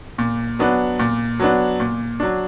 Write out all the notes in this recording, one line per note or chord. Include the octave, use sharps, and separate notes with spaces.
A#2
F#3 B3 D4
A#2
F#3 B3 D4
A#2
F#3 D4